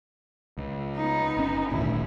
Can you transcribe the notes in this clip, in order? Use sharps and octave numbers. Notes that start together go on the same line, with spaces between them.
C#2
B3 D#4
G1 C#4
D#1 G#1 D2 E4